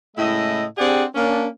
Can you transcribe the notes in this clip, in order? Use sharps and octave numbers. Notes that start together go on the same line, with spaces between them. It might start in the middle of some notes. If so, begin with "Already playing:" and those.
A2 C#3 G#3 E4 D#5
C4 D4 G4 G#4 D5 F#5
A#3 C#4 D4